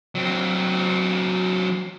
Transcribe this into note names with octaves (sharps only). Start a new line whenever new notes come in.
F#3 C4